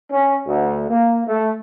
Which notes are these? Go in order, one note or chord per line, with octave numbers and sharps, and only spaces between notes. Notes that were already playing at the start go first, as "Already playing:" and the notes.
C#4
D2
A#3
A3